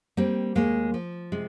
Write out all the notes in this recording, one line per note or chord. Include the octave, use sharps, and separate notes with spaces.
G3 A#3 C4
D#2 G#3 A#3
F3
C3 G#3